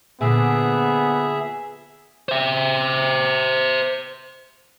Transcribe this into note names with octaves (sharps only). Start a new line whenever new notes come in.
A#2 D3 F3 B3 G#4 E5
C5 E5